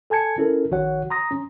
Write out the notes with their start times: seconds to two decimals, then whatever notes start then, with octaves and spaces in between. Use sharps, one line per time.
0.10 A4 G#5 A5 G#6 C#7
0.38 C#4 E4 A4 A#4
0.71 A#1 D#3 F#4 C#5 F#5
1.10 A#5 C6 D#6 A#6
1.31 C#4